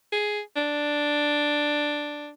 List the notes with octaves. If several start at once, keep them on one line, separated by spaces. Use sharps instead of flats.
G#4
D4